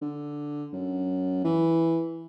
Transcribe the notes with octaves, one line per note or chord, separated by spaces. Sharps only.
D3
F#2
E3